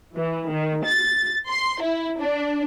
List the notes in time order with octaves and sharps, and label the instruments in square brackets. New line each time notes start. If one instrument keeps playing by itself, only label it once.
[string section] E3
D#3
A6
C6
E4
D4